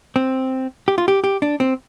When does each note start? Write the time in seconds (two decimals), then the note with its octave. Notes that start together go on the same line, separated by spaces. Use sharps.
0.16 C4
0.88 G4
0.98 F4
1.08 G4
1.24 G4
1.42 D4
1.60 C4